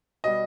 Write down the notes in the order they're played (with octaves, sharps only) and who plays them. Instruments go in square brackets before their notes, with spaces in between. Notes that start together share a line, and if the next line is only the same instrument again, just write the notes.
[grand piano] B2 G3 D#5